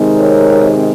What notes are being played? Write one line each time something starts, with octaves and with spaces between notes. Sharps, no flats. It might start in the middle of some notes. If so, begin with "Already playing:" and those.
Already playing: C3 D#3 G#3 C4 D#4
A#4 C#5